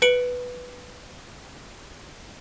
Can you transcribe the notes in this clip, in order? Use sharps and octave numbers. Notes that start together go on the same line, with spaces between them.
B4 C#7 D7 F#7